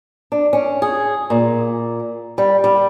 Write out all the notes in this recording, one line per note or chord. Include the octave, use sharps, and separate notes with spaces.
D4
C#4
G#4
A#2
G3
G3